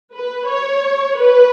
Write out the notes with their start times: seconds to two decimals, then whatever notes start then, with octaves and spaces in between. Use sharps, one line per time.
0.15 B4
0.49 C#5
1.18 B4